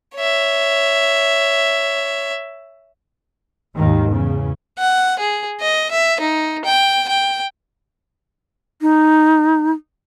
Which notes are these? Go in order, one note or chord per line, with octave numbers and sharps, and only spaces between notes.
C#5 E5
D#2 G#2 D#3
E2 C#3
F#5
G#4
D#5
E5
D#4
G5
G5
D#4